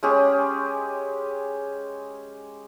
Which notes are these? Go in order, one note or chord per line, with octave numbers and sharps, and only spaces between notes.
G#3 C#4 G4 G#4